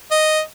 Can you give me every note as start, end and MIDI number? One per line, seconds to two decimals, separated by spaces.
0.11 0.40 75